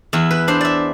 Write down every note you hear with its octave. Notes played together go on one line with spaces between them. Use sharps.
E2 E4
B4
D4 C5
D5 E5